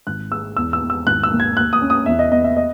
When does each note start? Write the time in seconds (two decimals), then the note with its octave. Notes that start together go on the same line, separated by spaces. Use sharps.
0.07 G#1 F#6
0.31 G#3 E6
0.57 E2 E6
0.73 E6
0.81 E2
0.90 E6
1.06 G#1 F#6
1.23 E6
1.31 A#3
1.40 G#6
1.56 D#2 F#6
1.73 D#6
1.82 C#4
1.90 D#6
2.06 E2 E5
2.19 D#5
2.32 B3 D#5
2.44 E5
2.57 D#5